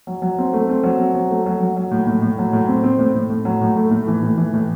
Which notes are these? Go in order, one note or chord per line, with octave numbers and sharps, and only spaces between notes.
F#3
F#3
C4
A3
C4
F#3
C4
F#3
A3
F#3
F#3
F#3
A2
A2
A2
F#3
A2
C4
C4
A2
A2
A2
F#3
A2
A3
A2
E3
A2
E3
A2